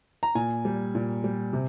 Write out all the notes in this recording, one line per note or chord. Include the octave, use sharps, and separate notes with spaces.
A#5
A#2 G#5
G3
A#2
G3
C3